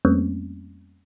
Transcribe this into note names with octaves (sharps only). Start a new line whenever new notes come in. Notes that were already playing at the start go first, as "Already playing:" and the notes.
F2 G3 A3 A#3 C4 C#4